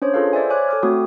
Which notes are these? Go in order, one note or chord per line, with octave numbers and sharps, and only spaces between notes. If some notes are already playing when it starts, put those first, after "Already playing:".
C#4 D4 C5 C#5
F4 G#4 A4 B4 F5
C5 D5 E5 G#5
C#5 G#5 D6 F#6
A4 D6 F6
A3 C4 F#4 D#6